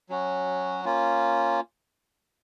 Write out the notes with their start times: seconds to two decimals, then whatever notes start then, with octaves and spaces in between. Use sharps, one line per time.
0.09 F#3 C#4 F#4
0.85 A#3 C#4 F4